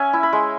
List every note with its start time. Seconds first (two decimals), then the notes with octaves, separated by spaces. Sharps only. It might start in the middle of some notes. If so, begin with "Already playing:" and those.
Already playing: C#4 E5 G#5
0.13 E4
0.23 B5
0.33 G#3